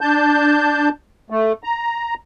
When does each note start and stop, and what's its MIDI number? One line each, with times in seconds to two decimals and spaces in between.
0.01 0.89 62
0.01 0.89 81
0.01 0.89 91
1.30 1.53 57
1.64 2.14 82